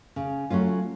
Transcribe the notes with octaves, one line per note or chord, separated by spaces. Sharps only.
C#3
F#3 A3 C#4 F4